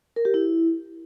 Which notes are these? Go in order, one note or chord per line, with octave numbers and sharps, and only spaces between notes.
A#4
G4
E4